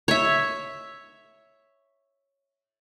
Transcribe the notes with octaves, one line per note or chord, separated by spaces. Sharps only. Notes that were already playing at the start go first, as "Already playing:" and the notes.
C#5 E5